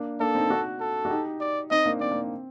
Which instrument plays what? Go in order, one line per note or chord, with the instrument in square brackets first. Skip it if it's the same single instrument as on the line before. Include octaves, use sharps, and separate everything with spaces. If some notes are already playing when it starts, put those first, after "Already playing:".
Already playing: [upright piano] A#3 D4
[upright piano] A#3 D4 [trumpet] A4
[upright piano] C4 D#4
D4 F#4
[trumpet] A4
[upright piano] F#4
D#4 G4
[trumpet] D5
[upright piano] C4 D#4 [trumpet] D#5
[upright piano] A#3 D4
[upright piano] C4 [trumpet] D5
[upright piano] A#3
C4